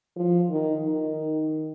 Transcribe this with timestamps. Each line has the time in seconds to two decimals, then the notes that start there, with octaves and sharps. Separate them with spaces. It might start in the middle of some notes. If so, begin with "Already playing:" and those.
0.16 F3
0.49 D#3
0.83 D#3